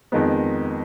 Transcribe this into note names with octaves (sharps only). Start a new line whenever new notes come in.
F2 D#3 G#3 B3